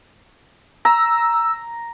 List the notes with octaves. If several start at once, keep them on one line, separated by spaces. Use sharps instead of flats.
A#5 E6